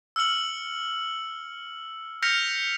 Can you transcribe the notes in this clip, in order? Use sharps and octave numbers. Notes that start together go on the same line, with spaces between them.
E6 F6 C#7 F#7
F6 G6 A#6 B6 C#7 F7